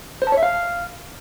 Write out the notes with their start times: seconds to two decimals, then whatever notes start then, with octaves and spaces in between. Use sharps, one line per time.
0.22 C5
0.27 A5
0.32 C#5
0.37 E5
0.43 F5